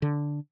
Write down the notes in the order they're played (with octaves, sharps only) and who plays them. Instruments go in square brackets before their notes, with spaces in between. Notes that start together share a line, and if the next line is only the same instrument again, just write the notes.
[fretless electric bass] D3